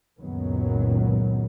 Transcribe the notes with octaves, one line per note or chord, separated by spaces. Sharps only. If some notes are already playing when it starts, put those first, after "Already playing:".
C#2 F#2 A#2 D#3 F#3 B3